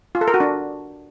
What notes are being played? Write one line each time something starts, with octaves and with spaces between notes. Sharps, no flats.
F4
A4
A#4
F#4
D4